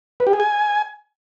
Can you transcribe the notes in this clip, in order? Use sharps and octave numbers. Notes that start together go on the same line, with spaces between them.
B4
G4
G#4
G#5